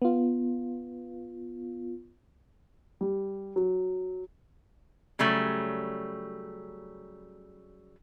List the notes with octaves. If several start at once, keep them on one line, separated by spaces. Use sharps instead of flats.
B3 F4
G3
F#3
C#3 F#3 G3 A3